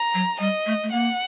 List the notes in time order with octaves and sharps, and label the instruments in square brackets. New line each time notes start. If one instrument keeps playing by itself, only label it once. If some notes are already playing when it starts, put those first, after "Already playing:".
Already playing: [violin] A#5
[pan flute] F#3
[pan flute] G3 [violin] D#5
[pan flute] A3
A3
[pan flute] A#3 [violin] F#5